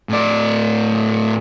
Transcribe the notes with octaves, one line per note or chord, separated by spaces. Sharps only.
A2 D5